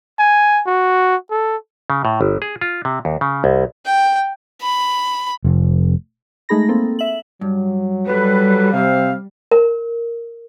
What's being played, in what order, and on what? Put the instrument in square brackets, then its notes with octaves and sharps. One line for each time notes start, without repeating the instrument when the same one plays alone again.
[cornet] G#5
F#4
A4
[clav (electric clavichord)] C#3
A2
G1
G#4
F4
C3
D#2
C#3
C2
[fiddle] G5
B5
[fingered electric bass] F1
[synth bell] G#3 A3 D#4 G#4 B5 A#6
A#3 C4 A4
E5 F#7
[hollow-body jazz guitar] G2 [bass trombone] F#3
[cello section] G3 [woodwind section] A4 B4
[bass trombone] C3 [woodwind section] C4 C5 F5
[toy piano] A#4